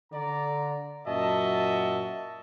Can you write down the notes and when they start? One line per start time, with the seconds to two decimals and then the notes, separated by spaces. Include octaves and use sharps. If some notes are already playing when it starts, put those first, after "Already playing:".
0.13 D3 D5 A#5
1.07 F#2 A#2 F#4 D#5 E5 A5